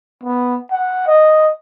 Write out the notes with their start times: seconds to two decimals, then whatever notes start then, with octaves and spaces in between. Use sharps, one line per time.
0.24 B3
0.71 F#5
1.07 D#5